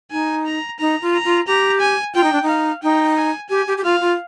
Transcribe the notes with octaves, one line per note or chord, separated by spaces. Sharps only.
D#4 G#5
A#5
D#4 A#5
F4
A#5
F4
G4 A#5
G#5
F4 G5
D#4
D4
D#4
F5
D#4 G5
G#5
G4 G#5
G4
G4
F4 F5
F4